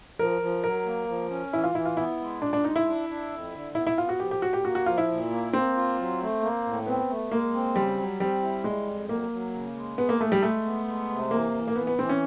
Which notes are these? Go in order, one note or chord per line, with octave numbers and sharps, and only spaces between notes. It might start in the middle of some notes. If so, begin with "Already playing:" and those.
F3 A#4
F3
F#3 A#4
A#3
F3
C#4
E3 E4
F4
E3 E4
F4
B3 E4
G#3
A#2 D4
D4
G#3 D#4
E4
D4
D4
F2
D3
B3 E4
E4
B3 F4
F#4
F3 G4
G4
A2 F#4
G4
A#3 F#4
F#4
F3 F4
E4
A#2
A#3
A#3 C4
F4
F#3
A3
A#3
A2
B3 C4
A3
G#3 A#3
C4
C#3 G3
F#3
G3 C4
E4
G3 G#3
F2
F#3 A#3
F#3
C#3
G#3
B3 G#4
A#3
A3 G#4
G3
G#3 A3
B3
G#3
C3
E3 A#3
E3
A#3
E3 B3
B3
E3 C4
C#4